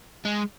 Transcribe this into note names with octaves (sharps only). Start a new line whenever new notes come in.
G#3